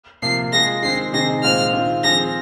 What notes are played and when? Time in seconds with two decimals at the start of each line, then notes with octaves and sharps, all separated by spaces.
0.22 C3 F3 A#3 C7
0.53 G#3 F4 G#4 A#6
0.82 D#3 G#3 C4 C7
1.13 C3 D#3 C4 D#4 G#4 A#6
1.43 A#2 G#3 F4 C5 F6
1.73 D#3 C4 F4
2.04 F3 C4 G#4 C5 F5 A#6